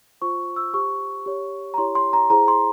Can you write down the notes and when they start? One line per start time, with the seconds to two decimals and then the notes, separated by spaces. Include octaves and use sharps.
0.21 F4 C5 C#6
0.56 E6
0.74 G4 C5 C#6
1.26 G4 C#5
1.74 A#5
1.78 E4 G4 C#5 C6
1.95 C6
2.13 A#5
2.30 E4 G#4 C5 A#5
2.48 C6